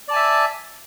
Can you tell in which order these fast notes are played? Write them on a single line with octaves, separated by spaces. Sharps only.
D5 A5 G#5 E5